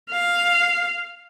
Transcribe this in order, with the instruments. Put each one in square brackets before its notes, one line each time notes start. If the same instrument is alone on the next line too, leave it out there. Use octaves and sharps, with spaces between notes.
[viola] F5